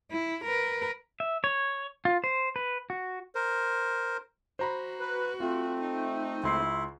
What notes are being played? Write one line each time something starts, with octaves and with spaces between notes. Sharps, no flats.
E4
A#4 B4
E5
C#5
F4
C5
B4
F#4
A#4 C5
F#4 C5 A#5 B5
B4
A3 C4 F4
D#4
C#2 E4 C6 C7